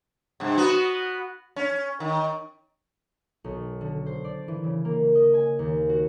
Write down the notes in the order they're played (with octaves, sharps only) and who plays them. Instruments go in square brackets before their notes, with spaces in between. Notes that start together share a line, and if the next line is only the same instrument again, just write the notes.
[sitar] G2 C3
B3 F#4
C#4
D#3
[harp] B1
D3
C5
D5
E3
C#3
A#3
D#5
G#5
D#2
F#4